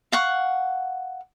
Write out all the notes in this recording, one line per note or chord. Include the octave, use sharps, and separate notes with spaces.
F5 F#5 C#6